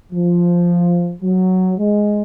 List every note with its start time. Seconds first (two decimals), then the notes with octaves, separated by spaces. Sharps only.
0.12 F3
1.23 F#3
1.78 G#3